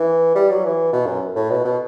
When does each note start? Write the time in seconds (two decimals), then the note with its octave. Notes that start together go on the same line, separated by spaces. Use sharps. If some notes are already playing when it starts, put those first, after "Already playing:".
Already playing: E3
0.35 G3
0.50 F#3
0.64 E3
0.93 B2
1.06 F#2
1.36 A2
1.50 B2
1.65 B2